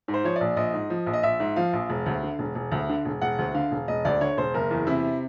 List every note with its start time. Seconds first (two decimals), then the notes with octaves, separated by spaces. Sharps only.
0.08 G#2
0.14 C5
0.24 F3 C#5
0.36 A#1 D5
0.57 A#1 D#5
0.73 G#2
0.90 F3
1.06 A#1
1.13 D#5
1.23 A#1 E5
1.40 G#2
1.56 F3 F5
1.73 A#1
1.90 E1
2.06 D2
2.23 D3
2.39 E1
2.55 E1
2.72 D2
2.89 D3
3.05 E1
3.21 E1 F#5
3.38 D2
3.54 D3 F5
3.71 E1
3.88 E1 D#5
4.05 D2 D5
4.21 D3 C#5
4.38 E1 C5
4.54 F#1 A#4
4.71 E2
4.87 C3 E4